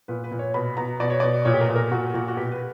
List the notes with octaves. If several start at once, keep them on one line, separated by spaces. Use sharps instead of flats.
A#2 B4
B4
A#2
C#5
B2 B5
B2 A#5
B2 D5
C#5
B2 D5
A#2 C#5
G4
A#4
A#2
A#4
A#2 F#4
A#2 F#4
F#4
B2 G4
B4